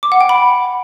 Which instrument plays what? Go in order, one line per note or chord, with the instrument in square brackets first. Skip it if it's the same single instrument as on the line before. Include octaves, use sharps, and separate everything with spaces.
[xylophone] D6
F#5
G5
B5